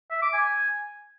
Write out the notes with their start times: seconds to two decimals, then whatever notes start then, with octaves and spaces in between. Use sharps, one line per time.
0.11 E5
0.22 D6
0.33 G#5